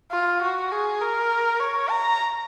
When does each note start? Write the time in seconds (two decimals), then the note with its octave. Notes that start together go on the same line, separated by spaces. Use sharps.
0.11 F4
0.42 F#4
0.72 G#4
1.01 A#4
1.60 C#5
1.90 A#5